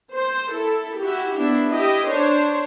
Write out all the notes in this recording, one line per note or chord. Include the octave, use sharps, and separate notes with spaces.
C5
E4 A4
E4 F#4 G4
B3 D4 E4
E4 G4 D#5
D4 C5 C#5